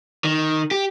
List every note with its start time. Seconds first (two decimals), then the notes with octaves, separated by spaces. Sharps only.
0.24 D#3
0.71 G4